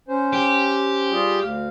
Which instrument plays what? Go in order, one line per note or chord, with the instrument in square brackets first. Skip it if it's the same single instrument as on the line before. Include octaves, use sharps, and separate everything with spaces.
[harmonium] C#4 C5
[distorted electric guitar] G4
[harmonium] G3 F4 G#4
D2 F5